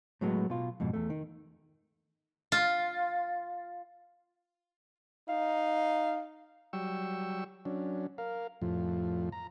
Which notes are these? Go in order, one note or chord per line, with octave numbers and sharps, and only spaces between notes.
A2 F#3 G#3 B3
B2 F4
F2 G#2 B2
E2 A3
D#3
F4
D#4 F5
F#3 G3 G5 C#6 E6
F#3 C#4 D4
A#4 F5
F2 A2 F3
A#5